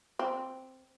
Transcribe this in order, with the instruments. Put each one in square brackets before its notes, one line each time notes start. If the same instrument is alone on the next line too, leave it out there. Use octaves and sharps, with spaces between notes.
[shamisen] C4